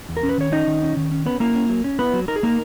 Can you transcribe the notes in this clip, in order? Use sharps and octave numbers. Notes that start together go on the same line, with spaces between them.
E2
A#4
C#4
B4
D#3 C#5
C#4 D#4 D#5
D#3
C#4
D#3
C#4
B3 C#4 B4
A#3 E4 A#4
C#4
F#3
C#4
B3 E4 B4
F#3
D#4 A#4
G#4
A#3 D#4 A#4